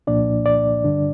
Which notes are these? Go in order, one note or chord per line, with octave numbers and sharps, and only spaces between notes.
C2 A#2 F3 A#3 D4 D5
D5
G2 D3 G3 D4